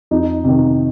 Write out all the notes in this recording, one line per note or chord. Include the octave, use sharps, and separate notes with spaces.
F2 D#4
C3 D#3